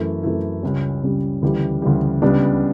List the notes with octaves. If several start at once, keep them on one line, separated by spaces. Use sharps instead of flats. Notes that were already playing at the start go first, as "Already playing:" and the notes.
Already playing: F#2 E3 A3 E4
F#2 E3 A3 E4
C#2 C#3 G3 C#4
C#2 C#3 G3 C#4
D2 C#3 E3 G3
D2 C#3 E3 G3
C#2 C#3 G3 B3 D4